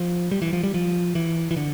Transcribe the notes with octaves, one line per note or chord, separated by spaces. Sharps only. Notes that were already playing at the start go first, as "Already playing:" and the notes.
Already playing: F3
G3
E3
F3
G3
F3
E3
E3
D3